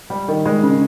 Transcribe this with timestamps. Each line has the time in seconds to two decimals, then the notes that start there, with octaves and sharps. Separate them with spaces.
0.10 G3
0.28 D#3
0.46 G#3
0.63 C#3